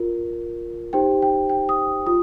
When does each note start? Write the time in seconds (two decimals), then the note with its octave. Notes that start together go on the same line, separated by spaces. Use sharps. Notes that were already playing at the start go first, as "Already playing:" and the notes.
Already playing: F4 A#4
0.93 D#4 G4 C5 G5
1.22 G5
1.49 G5
1.69 D#6
2.06 F4 D#6